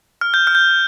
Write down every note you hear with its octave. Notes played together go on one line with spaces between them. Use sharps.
F6
G6
F6
G6